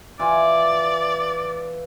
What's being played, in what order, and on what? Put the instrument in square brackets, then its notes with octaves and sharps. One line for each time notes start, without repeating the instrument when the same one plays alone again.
[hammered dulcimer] E3 F4 G#5 [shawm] D5